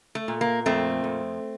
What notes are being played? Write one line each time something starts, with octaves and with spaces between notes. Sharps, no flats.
A3
A#2
A#3
F2 A3 C4
F2